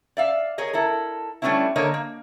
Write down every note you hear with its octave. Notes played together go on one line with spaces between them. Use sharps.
D5 E5 F5
G#4 A#4 C#5 D#5
E4 A4 A#4
G3 A3 B3 C#4 D4 E4
D3 A#3 A#4 C#5 D#5
A#3